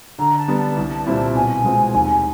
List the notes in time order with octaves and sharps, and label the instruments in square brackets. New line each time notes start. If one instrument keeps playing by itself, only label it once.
[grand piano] D3 [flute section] A#5
[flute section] A5
[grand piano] G3 B3 D4
[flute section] A5
[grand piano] C2
A#2 G3 C4 E4
[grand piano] B2 [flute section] G#5
[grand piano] G#3 C4 F4
D#2